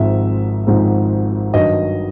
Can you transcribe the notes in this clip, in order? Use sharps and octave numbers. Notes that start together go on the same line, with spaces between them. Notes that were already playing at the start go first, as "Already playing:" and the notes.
Already playing: G#1 G#2 F3 G#3 C4 E5
G#1 G#2 F3 G#3 C4
G2 D#3 F#3 D#5